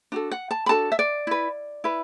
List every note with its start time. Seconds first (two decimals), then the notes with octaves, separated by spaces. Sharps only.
0.12 D4 F#4 A4
0.31 F#5
0.51 A5
0.66 B5
0.69 D4 F#4 A4 A5
0.92 E5
0.99 D5
1.27 E4 B4
1.84 E4 B4